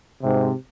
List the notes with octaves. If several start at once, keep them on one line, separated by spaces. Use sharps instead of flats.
G#2 C3